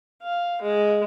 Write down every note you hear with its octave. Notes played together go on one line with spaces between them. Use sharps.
F5
G#3